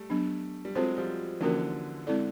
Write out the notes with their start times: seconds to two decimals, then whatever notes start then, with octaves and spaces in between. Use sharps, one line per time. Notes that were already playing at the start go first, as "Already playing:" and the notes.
Already playing: G3 A3
0.10 F#3 B3 D4
0.65 G3
0.75 F#3 G#3 C4 F4 A4 C5
0.97 F3 G3
1.40 D3 E3 F3 A#3 C#4 F#4 A#4
2.07 G#3 C4 E4 A4 D5